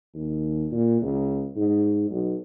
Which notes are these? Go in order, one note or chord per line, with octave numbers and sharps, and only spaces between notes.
D#2
A#2
C#2
G#2
B1